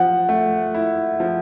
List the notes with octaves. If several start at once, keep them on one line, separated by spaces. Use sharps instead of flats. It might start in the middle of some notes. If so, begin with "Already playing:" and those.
Already playing: F3 F#5
A3
E4
F3